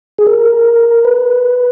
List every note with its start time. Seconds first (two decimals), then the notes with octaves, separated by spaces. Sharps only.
0.18 G#4
0.27 A#4
1.05 B4